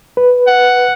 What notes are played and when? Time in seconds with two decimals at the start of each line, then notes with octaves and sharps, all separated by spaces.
0.17 B4
0.47 F#5